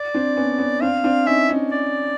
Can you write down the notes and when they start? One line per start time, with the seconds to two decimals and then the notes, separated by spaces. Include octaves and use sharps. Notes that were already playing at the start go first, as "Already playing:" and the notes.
Already playing: D5
0.14 C4 D4
0.36 B3 C#4
0.58 B3 C#4
0.81 C4 D4 F5
1.04 C4 D4
1.26 C#4 D#4 E5
1.49 C#4 D#4
1.71 D5